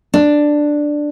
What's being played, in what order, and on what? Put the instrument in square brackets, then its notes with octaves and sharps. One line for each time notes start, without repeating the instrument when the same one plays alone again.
[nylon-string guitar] D4